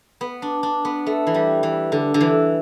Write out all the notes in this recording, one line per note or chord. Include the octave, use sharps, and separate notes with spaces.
B3
D4
D4
B3
A3
E3
G3
E3
D3
D3
E3